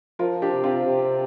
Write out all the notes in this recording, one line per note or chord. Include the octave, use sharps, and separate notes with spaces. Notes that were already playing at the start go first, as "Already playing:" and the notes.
F3 F4 A#4
D4 G4
C3
C4 F4
C3